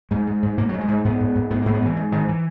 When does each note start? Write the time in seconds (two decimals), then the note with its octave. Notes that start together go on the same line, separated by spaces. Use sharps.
0.11 G#2 G#3
0.27 G#2
0.42 G#2
0.57 G#2 A#3
0.69 G#2 F#3
0.81 G#3
0.88 G#2
1.05 G#2 B3
1.20 G#2
1.35 G#2
1.50 G#2 B3
1.62 G#2 A#3
1.74 B3
1.82 G#2 E3
1.97 G#2
2.12 G#2 D#3
2.28 E3